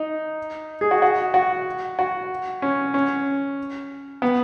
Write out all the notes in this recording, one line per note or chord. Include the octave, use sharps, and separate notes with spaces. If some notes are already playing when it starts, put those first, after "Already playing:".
Already playing: D#4
G#4
F#4
F#4
F#4
F#4
C#4
C#4
B3